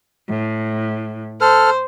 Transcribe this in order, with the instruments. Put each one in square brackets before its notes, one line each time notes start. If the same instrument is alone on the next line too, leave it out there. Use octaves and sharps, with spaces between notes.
[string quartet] A2
[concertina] A4 F6 [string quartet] C5